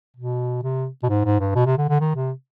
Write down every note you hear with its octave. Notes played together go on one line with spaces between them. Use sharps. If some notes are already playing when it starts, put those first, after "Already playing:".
B2
C3
B2
G#2
G#2
G2
B2
C3
D3
D3
D#3
C3